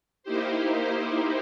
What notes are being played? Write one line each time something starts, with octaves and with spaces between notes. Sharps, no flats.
A#3 D#4 E4 G4 C5